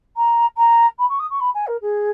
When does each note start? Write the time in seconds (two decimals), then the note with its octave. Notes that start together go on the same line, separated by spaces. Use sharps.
0.17 A#5
0.57 A#5
0.98 B5
1.09 C#6
1.19 D#6
1.30 C#6
1.40 B5
1.54 G#5
1.67 A#4
1.82 G#4